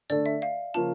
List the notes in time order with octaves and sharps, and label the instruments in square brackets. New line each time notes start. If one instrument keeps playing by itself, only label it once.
[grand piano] D3 A3 D4 A4 [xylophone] D5
[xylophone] E5
F5
[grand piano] C#3 F3 A#3 C#4 F4 [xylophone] A5